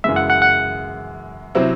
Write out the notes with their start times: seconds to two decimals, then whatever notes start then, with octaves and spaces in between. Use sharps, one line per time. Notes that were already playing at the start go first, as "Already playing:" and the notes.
0.04 F#2 C#3 E3 G#3 E5
0.16 F#5
0.30 F#5
0.42 F#5
1.55 C3 F#3 C4 E4